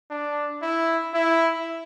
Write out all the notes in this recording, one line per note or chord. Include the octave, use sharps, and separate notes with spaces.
D4
E4
E4